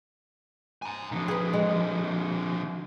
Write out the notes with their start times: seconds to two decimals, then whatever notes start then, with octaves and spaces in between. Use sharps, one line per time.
0.82 G#5 A#5
1.12 D3 F3
1.28 G#4 B4
1.53 G#3